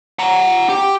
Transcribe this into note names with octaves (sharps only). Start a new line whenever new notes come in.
F#5 A#5
G4